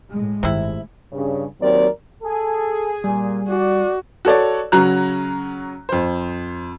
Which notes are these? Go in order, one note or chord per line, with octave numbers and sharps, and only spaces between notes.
A2 G#3
G1 C3 D#3 E4
G2 C#3
D#2 F#3 C4 A#4 D5
G#4 A4
A#2 G3
F#4 D5
F#4 A4 C#5 D5
C#3 F#3 C#4 F#4 A#5 F#6
F2 C5